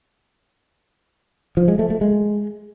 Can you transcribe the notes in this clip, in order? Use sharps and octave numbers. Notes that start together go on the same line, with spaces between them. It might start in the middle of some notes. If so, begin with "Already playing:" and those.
F3
G#3
A3
A3
G#3